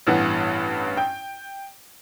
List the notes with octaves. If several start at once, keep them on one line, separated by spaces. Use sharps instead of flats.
A1 G2 E3 B3 F#5
G5